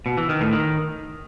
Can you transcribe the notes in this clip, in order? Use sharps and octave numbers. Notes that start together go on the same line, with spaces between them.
B2
E3
D#3
A2
D#3